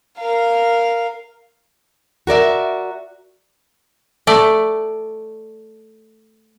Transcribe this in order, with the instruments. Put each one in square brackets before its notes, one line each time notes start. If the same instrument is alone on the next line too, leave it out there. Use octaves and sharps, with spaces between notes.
[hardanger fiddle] A#4 F5
[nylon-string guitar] F#4 A#4 D5 E5
[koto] A3 D5